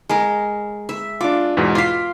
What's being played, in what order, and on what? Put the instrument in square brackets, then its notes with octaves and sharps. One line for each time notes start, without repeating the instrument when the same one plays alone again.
[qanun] G#3 A#4
E5
[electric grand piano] D4 F4 [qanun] D6
[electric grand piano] E2 G#2 B2
[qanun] F4 F5 [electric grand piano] D6 B6